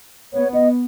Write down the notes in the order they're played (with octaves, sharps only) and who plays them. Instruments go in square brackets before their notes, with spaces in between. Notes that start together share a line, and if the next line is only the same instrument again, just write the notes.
[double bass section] B3 [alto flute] C#5
[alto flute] D#5